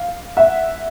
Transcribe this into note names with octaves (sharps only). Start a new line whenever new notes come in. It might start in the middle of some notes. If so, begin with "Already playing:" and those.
Already playing: F5
E5 F#5